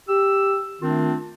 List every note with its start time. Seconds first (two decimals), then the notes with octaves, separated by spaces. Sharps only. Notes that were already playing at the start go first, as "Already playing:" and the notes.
0.08 G4 E6
0.82 D#3 A3 C4 D4 F4